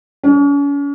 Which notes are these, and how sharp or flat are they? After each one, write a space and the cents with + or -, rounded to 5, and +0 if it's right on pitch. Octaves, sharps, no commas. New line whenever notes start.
C#4 +40